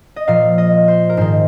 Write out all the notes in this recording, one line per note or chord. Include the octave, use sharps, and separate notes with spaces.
D#5
A#2 F3 F5
D#5
C5
A#4
G#2 D#3 C5